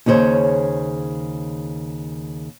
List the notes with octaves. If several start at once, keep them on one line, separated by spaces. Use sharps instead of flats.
D#2 C#3 G#4 C5 C#5